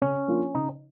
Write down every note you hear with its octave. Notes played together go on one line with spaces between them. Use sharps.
C#3 C#4
F3 A#3 D4 F4
C#3 D#4